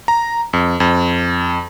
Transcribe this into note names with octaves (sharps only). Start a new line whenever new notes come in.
A#5
F2
F2